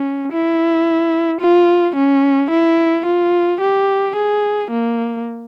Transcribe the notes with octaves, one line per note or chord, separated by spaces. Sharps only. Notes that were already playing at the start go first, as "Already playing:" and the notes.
Already playing: C#4
E4
F4
C#4
E4
F4
G4
G#4
A#3